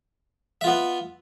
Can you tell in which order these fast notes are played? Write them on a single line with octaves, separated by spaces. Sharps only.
E5 F4 B3